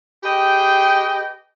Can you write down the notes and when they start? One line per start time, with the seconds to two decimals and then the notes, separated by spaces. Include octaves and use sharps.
0.24 G4 G#4 B4 D#5 G5